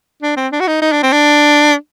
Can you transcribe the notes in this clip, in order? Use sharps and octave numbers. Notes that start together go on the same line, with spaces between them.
D4
C4
D4
F#4
D#4
D#4
D4
C4
D4